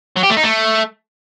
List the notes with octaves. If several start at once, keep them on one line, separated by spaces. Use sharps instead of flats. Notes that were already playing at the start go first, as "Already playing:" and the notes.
F#3
G4
A3
D#4
A3